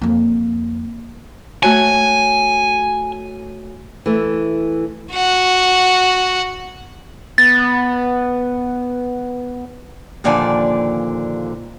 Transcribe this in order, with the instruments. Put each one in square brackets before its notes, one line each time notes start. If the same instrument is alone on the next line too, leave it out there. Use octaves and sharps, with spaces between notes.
[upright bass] F2 A#3
[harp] A3 F#4 C#5 [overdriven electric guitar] G#5
[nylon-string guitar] E3 A3
[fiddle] F#4 F#5
[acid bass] B3 [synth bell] A6
[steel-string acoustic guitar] D#2 A#2 D3 F3 D5 G#5